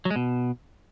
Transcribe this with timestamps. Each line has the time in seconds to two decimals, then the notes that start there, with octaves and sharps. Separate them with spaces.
0.05 F#3
0.10 G#3
0.16 B2